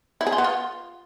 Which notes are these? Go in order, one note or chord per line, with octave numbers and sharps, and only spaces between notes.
E4
G#4
F4
B3
F4